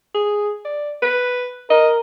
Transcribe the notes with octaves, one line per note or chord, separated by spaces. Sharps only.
G#4
D5
B4
A#4 D#5